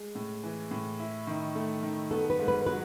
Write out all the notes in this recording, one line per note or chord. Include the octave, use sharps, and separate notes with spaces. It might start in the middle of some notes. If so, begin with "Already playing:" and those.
Already playing: G#3
A2
E3
A2
E4
D#3
A3
D#3
B3 A4
B4
G#2
B4
F#3 B4